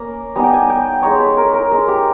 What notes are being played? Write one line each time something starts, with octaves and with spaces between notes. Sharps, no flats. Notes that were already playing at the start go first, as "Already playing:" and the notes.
Already playing: A#3 C#4 A#5
G3 B3 D#4 G#5
G5
G#5
G5
G#3 D#4 C#5
B4
A#4
A#4
G#3 D#4 A#4
G4